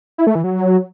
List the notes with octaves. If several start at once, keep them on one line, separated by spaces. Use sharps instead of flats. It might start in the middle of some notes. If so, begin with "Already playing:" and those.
E4
A3
E3
F#3